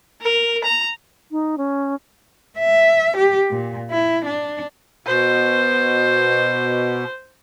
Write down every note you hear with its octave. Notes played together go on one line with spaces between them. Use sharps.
A#4
A#5
D#4
C#4
E5
G4
A#2
E4
D4
B2 C5